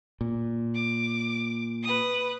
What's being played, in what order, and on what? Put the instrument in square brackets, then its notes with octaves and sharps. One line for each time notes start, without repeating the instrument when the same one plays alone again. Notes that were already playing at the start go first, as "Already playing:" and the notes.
[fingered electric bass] A#2
[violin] D6
B4 D#6